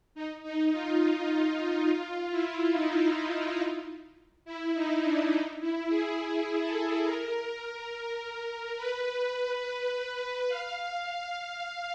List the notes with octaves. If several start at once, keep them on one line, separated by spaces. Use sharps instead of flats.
D#4
D#4
F4
F4
E4
D#4
E4
D#4
D4
D#4
E4
G#4
G#4
A4
A#4
B4
F5